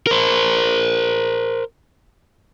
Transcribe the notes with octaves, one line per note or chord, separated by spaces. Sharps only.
A#4 C5